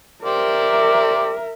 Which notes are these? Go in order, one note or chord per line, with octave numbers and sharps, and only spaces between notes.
G4 A#4 C5 D5 E5